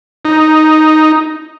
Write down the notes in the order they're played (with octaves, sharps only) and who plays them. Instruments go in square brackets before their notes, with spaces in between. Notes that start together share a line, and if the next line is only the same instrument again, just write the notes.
[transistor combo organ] D#4